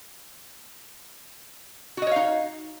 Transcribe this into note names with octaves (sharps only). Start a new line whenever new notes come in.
D#4 F#4 C#5 D#5 F5